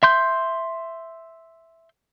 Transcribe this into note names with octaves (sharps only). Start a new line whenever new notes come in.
E5 C6 G6